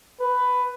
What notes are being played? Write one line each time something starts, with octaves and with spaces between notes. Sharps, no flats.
B4